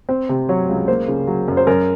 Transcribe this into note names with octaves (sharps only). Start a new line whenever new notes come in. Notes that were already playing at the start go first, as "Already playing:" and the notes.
C4
C3
F#3 C#5
C#2
A#3 C5
C#3
F#3
F#2
C5
F#2 A#4